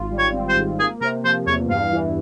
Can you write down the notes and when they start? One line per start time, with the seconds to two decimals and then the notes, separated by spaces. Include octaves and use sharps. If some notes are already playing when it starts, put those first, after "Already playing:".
Already playing: G#1 F4
0.11 G3
0.18 C#5
0.33 C4
0.49 C5
0.56 G#2
0.78 A#3 G#4
1.01 C3 A#4
1.24 F3 C5
1.46 E2 C#5
1.69 G2 F5
1.92 E3